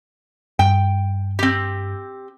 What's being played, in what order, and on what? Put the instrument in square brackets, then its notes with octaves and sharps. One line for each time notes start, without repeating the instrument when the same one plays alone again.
[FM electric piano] G2 [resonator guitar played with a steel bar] G5
[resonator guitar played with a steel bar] C4 G4